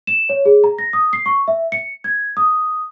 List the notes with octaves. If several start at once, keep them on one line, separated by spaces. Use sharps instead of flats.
E7
C#5
G#4
A#5
A#6
D#6
C7
C#6
E5
C#7
G#6
D#6